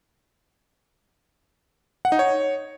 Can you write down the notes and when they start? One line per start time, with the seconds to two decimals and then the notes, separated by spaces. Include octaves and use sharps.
2.05 F#5
2.12 D#4
2.19 C#5